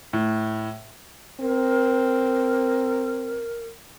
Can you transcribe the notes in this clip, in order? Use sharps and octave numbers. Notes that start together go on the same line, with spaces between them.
A2
C4 A#4